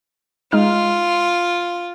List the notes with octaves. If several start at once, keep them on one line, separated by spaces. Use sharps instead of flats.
G#3 D#4 F4 F6